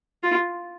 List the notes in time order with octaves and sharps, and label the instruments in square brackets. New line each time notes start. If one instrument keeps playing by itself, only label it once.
[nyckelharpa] F4